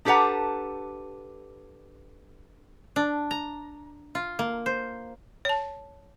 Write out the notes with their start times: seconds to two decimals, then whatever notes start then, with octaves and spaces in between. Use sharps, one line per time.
0.05 D4 G4 A4 B4 F#5 A#5
2.96 D4
3.31 A#5
4.15 F4
4.39 A#3
4.66 C5
5.45 C#5 A5